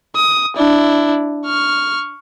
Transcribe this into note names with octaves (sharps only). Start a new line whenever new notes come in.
D#6
D4 E4
C#6 F6